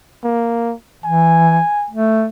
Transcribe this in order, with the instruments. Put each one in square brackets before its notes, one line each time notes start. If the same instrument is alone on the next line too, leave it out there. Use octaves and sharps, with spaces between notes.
[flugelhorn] A#3
[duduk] E3 [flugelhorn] G#5
[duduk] A3